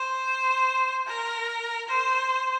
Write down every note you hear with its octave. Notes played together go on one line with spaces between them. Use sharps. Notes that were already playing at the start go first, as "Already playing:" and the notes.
Already playing: C5
A#4
C5